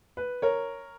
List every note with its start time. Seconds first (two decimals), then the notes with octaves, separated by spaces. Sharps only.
0.17 B4
0.42 A#4 C#5